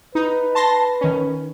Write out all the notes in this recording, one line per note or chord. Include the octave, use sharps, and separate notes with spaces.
D#4 B4
A5 C6 A#6
D#3 C#4